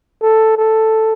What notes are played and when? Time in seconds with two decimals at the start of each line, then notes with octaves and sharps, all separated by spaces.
0.22 A4
0.58 A4